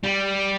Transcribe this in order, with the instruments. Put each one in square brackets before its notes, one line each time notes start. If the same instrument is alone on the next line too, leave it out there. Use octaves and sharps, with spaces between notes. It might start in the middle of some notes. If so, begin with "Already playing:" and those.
[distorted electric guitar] G3